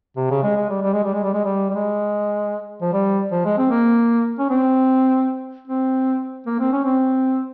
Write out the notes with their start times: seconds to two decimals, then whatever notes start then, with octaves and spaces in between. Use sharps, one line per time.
0.17 C3
0.31 C#3
0.43 G#3
0.56 G#3
0.70 G3
0.82 G3
0.93 G#3
1.04 G3
1.14 G#3
1.24 G3
1.34 G#3
1.45 G3
1.70 G3
1.75 G#3
2.82 F3
2.93 G3
3.31 F3
3.45 G#3
3.57 C4
3.71 A#3
4.39 C#4
4.50 C4
5.68 C4
6.47 A#3
6.59 C4
6.73 C#4
6.85 C4